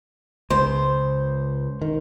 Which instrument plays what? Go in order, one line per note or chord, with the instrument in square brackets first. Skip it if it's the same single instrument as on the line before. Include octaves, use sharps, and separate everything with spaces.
[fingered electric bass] C#2 [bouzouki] C5
[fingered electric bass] D#3